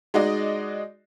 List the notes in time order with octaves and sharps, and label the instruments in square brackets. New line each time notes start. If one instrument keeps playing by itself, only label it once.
[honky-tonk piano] G#3 D#4 F#4 D5 D#5